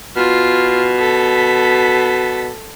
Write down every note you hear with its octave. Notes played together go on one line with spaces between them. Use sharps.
B2 F4 F6
A4 B6